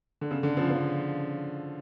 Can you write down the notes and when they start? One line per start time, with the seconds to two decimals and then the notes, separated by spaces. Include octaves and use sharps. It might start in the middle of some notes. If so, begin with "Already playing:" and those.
0.21 D3
0.31 C#3
0.43 D3
0.57 C#3 F3
0.70 C#3 F3